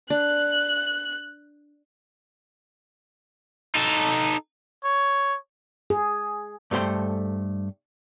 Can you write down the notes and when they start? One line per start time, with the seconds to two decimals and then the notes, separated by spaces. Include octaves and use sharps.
0.10 D4 F#6
3.75 D#4 A4
4.84 C#5
5.90 G#4
6.71 G2 A3 A4 C5 G5 C6